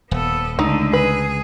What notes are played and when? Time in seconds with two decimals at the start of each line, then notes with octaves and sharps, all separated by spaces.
0.11 D#1 B3 A4
0.59 C#2 D3 A3 D#4
0.93 G#4 B4